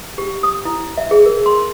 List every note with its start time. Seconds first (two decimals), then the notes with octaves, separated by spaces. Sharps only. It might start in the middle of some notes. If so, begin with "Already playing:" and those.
0.18 G4
0.43 D#6
0.65 E4
0.98 E5
1.11 G#4
1.26 A#4
1.46 C6